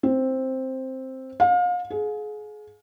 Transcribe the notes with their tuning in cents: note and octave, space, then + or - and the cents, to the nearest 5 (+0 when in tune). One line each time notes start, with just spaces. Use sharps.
C4 +5
F5 +35
G#4 +30